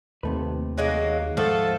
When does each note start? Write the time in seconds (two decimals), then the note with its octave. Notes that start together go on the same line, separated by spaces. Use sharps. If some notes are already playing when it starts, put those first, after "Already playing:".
0.23 D#2 C3 A3 B4
0.78 F#3 G#3 A#3
1.37 G#2 F3 A3 A4 F#5